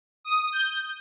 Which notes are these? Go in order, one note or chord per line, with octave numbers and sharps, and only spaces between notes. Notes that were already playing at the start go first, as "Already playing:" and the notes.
D#6
G6